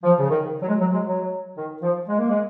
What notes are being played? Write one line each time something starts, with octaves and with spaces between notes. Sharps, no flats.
F3
C#3
D#3
F#3
G#3
F#3
G#3
F#3
D#3
F3
G#3
A#3
G#3